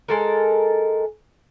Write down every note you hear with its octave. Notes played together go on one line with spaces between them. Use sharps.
G#3 A4 A#4